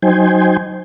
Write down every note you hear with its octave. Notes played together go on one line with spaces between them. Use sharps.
F#3 D#4 C5 G5 G#5